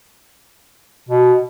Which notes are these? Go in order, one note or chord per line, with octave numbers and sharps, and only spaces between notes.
B2